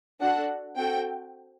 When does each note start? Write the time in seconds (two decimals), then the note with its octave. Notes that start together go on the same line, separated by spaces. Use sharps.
0.21 D4 F#4 A4 F#5
0.77 C4 F#4 A4 G5